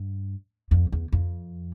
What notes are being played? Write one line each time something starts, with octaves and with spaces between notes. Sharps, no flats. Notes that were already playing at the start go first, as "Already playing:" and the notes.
Already playing: G2
F2
E2
F2